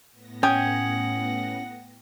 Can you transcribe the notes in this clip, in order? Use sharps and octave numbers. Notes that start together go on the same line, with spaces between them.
A2 B3 A#6
C#4 F#5 G5 D#6 G#6